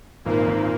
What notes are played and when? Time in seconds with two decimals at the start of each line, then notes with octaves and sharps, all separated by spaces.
0.25 G#1 A#2 A#3
0.47 G#1